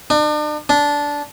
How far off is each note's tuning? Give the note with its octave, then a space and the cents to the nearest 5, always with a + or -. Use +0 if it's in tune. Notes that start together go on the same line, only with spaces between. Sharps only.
D4 +40
D4 -15